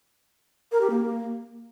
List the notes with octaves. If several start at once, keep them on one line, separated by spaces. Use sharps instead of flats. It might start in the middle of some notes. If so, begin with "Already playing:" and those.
A#4
G4
A#3